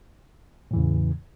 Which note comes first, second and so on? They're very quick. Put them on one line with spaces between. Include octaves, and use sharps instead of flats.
A2 E3 E2 C#3